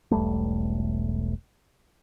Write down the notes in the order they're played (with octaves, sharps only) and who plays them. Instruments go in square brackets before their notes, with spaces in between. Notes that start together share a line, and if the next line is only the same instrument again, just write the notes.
[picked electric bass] E1 B1 G3 A3